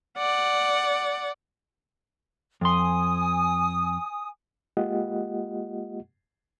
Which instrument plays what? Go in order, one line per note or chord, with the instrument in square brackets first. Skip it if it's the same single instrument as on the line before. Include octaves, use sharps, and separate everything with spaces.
[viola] D5 F#5
[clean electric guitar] F2 C6 [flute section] G#5 D#6
[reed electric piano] G#3 A#3 F4 G4 D#5 F#5